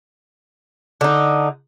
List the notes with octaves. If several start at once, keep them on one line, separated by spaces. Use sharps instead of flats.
D3 D#4